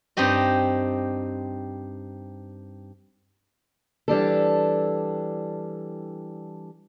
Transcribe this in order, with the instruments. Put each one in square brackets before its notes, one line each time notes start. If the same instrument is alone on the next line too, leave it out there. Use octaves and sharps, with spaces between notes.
[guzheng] G2 C4 D#4 G4 D#5
[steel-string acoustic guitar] E3 G3 D4 A4